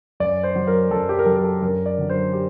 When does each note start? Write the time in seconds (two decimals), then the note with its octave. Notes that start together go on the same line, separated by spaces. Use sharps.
0.20 F#2 D5
0.43 C5
0.56 F#3
0.67 A#4
0.91 F#2 A4
1.09 G4
1.19 A#4
1.26 F#3 A4
1.36 A#4
1.44 A4
1.62 F#2 A#4
1.86 D5
1.98 D3 F#3
2.09 C5
2.33 G4